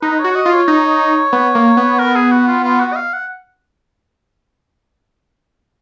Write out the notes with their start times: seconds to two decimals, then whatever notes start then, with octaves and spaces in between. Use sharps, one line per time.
0.02 D#4 B4
0.19 C#5
0.24 F#4
0.35 D#5
0.46 F4
0.52 C#5
0.68 D#4
1.33 B3
1.55 A#3
1.77 B3
1.99 A#4
2.15 G#4
2.31 F#4
2.48 F4
2.64 F4
2.80 F#4
2.92 D#5
2.96 F5
3.13 F#5